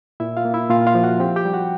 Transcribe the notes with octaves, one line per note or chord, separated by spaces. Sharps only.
A#2 E4 E5
F4 F5
A#3
E4 E5
A#2 F4 F5
F4 F5
F3
F#4 F#5
C4 G4 G5
G4 G5
G3
F#4 F#5